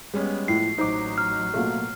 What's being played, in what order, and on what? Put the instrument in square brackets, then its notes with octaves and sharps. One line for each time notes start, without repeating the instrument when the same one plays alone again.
[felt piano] G3 C#4 [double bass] G#3 B3
[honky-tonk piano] A2 [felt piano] F3 [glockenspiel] C7
[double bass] A1 F#3 [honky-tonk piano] D#4 D6 [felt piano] C5
[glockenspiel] F6
[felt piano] B2 A#3 [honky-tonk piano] A3 F4